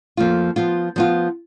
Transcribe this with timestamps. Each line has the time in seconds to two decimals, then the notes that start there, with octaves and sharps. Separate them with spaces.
0.17 F2 F3 A#3 F4
0.56 F3 B3 F4
0.96 F3 B3 F4